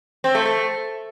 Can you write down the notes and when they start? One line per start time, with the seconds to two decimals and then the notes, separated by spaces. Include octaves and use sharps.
0.24 C4
0.35 A3
0.45 A3